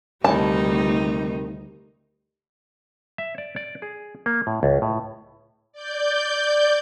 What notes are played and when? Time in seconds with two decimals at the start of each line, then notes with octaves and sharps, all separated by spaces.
0.24 D2 C3 D#3 G3 D#4 E4 A5
3.18 E5
3.38 D5
3.56 D5
3.82 G#4
4.26 A#3
4.47 A2
4.63 C#2
4.82 A2
5.72 D5 G6